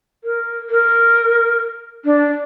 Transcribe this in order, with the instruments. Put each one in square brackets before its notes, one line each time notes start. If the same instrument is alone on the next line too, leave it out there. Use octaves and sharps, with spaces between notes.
[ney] A#4
A#4
D4